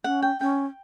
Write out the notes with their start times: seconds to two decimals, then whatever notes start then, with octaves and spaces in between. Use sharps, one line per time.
0.04 C#4 F#5
0.22 G5
0.41 C#4 G5